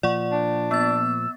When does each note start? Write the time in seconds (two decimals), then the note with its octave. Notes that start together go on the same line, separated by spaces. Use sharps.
0.03 A#2 F3 D5 F#5 C#6
0.32 D4
0.71 B3 E6 A6